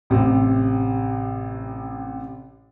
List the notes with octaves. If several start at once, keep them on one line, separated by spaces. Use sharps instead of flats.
A1 C3